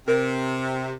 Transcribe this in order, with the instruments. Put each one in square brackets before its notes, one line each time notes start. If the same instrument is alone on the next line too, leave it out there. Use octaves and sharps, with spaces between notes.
[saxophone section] C3 [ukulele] A#4